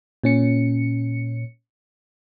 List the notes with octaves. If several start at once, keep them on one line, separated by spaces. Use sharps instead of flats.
A#2 C#4 C#7